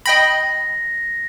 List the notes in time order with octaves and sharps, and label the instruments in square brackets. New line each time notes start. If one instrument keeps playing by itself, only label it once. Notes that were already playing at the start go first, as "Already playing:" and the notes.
[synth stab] D#5 G5 B5 [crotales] A#6